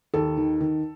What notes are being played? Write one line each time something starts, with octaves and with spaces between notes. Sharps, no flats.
D#2 A4
D#3
D#3